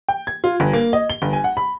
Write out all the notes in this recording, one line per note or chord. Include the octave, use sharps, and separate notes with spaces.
G5
G#6
F4
G1
A#3
D#5
G7
G1
G#5
F#5
B5